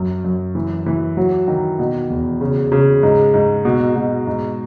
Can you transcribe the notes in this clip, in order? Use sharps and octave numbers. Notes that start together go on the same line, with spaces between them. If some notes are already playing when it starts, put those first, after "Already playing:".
Already playing: F#2
F#2
E3
E3
F#3
D#3
B2
E2
C#3
C#3
G#2
G#2
B2
B2
G#2